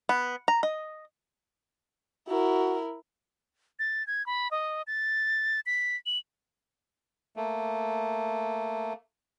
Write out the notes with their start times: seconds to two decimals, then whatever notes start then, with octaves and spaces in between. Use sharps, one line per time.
0.09 B3
0.48 A#5
0.63 D#5
2.28 E4 F#4 A#4
3.79 A6
4.07 G#6
4.26 B5
4.51 D#5
4.87 A6
5.66 B6
6.06 F#7
7.37 A3 A#3